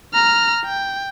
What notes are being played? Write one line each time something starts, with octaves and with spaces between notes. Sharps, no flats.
A#5 F6
G5